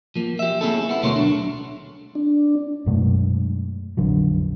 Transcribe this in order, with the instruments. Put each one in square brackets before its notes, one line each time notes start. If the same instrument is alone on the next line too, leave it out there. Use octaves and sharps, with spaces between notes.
[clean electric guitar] F3 A#3
G4 E5
A#3 C4 C#4 E4 G#4 A4
B3 E4
D2 B2 A3 A#4 C#5 C6
B1 D4
[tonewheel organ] D4
[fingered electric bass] F#2 B2 G#3 A3
A#1 F2 D3 F#3